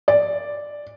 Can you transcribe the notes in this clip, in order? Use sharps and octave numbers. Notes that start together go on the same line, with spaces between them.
D5